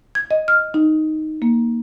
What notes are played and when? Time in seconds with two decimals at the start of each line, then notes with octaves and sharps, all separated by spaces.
0.15 G#6
0.31 D#5
0.48 F6
0.74 D#4
1.42 A#3